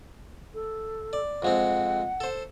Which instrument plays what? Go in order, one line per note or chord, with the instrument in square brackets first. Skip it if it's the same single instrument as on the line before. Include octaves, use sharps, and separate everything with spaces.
[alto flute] A4
[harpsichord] D5
[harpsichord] F2 G#3 C4 [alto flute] F#5
[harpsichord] A4 C5